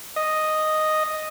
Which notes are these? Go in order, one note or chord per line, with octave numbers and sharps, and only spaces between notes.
D#5